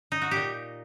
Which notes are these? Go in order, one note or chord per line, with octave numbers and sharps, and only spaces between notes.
D#4
F#4
A#2 G4